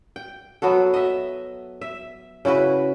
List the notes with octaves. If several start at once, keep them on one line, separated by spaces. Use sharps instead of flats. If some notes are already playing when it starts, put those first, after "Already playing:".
G5
F#3 B3 F#4 A4
D#5 E5
E5
C#3 E4 F#4 B4